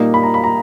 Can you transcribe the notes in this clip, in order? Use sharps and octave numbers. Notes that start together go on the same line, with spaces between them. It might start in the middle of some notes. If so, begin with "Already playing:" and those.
Already playing: A#2 G3 A#3 D#4
B5
A#5
B5
A#5